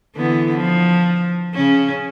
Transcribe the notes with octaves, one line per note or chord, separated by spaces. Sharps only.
D3 E3 B3
F3
C#3 C#4